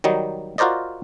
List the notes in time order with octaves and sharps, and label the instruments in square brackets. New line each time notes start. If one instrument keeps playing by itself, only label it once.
[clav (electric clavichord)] D#3 F#3 G3 D#4
F4 F#4 A#4 C5 D5 D#5